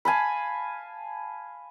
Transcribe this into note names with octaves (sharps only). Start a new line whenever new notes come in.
F5 G#5 A5 B5